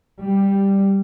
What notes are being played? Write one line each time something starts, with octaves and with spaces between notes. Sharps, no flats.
G3